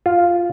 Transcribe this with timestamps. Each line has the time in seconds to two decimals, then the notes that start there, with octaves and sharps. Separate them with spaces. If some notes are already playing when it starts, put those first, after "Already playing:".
0.06 F4